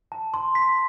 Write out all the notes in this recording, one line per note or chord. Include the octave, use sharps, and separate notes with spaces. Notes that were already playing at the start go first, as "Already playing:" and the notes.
A5
C6
B6